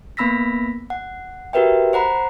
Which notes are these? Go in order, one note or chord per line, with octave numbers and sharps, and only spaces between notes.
A#3 B3 B5 E6 A#6 B6
F#5
F#4 G4 A#4 B4 E5 G5
C5 F#5 A#5 B5